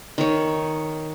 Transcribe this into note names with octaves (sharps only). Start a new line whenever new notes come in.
D#3 C#5